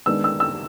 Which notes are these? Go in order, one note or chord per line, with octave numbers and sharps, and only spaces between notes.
D#3 G#3 B3 D4 E6
E6
E6